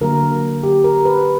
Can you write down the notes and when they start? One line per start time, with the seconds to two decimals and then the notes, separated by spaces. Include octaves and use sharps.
0.01 D3 F#3 A#3 A#4
0.63 G4
0.84 A#4
1.05 B4